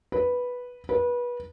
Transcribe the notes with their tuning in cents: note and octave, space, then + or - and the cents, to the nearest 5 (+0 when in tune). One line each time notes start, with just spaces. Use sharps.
B4 -5
B4 -25